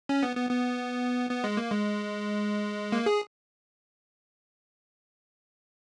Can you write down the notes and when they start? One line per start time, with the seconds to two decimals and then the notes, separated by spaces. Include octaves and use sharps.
0.09 C#4
0.23 B3
0.36 B3
0.51 B3
1.31 B3
1.44 G#3
1.57 A#3
1.71 G#3
2.92 A#3
3.06 G#4